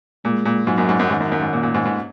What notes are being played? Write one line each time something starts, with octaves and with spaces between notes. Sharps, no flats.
A#2 G#3
A#2
G#2 F#3
F#2
G#2
F#2
G#2 D#3
F#2
F#2
G#2
A#2
A#2
G#2
G#2